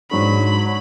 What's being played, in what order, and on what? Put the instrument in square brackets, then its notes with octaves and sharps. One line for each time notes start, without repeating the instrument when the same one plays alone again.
[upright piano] G#2 D4 [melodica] F#3 [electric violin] B5